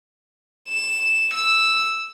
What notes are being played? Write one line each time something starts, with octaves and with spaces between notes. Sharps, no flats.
E7
E6